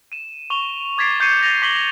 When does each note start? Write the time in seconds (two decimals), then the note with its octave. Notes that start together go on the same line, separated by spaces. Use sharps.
0.12 D#7 E7
0.50 C#6 F7 G7
0.98 D6 G#6 A6 B6 C7 D7
1.20 C#6 G6 G#6 C7 C#7 D#7
1.42 G6 A6 A#6 C#7 F7 G7
1.62 C#6 D6 B6 C7 F#7 G7